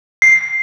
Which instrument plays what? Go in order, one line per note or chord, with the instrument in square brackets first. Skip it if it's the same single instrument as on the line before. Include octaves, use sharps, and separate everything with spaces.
[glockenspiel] C7